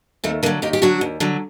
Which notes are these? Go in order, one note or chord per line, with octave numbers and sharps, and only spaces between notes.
D#2 A3 C4
D3 F#3 A#3
D#2 D#4 G4
G4
D3 F#3 D4 F#4
D#2
D3 F#3